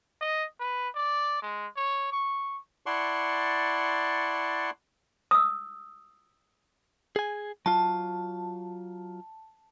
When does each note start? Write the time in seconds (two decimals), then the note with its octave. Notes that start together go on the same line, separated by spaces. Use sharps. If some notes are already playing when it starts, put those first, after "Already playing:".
0.21 D#5
0.60 B4
0.95 D5
1.42 G#3
1.77 C#5
2.12 C#6
2.86 E4 D5 F#5 A5 C6 C#6
5.31 D#6 E6
7.16 G#4 G#5
7.66 F#3 F4 A5